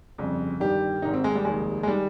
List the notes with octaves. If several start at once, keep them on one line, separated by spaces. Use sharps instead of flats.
G1 F2 C#3
G1 G2 D#3 G4
G#1 G#2 D#3 D#4
C4
G#3
G3
F1 D#2 D#3 G#3
G#3
D#3 G3